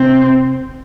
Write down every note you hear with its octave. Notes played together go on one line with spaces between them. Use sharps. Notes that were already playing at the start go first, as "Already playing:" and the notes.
Already playing: C3 C4